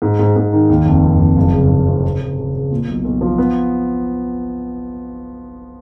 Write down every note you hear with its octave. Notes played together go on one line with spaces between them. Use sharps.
G#2
G#2
G#2
D#3
D#2
F1
F1
F1
F#1
C#3
F#1
F2
C#3
C#3
C#3
C#3
A#2
B1
B1
F3
B3